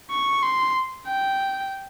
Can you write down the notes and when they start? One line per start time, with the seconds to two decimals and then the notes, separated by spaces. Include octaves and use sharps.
0.10 C#6
0.43 C6
1.07 G5